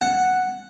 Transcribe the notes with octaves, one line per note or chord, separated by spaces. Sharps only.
F#5